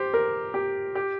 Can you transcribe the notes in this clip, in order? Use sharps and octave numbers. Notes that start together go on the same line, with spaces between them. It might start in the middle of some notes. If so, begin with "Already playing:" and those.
Already playing: G4 C5
A#4
G4
G4